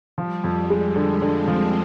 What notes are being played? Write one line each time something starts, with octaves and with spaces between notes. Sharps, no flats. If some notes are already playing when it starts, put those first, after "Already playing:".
F3 G3
F2
G#3
D3 G#3
D3
C4
F3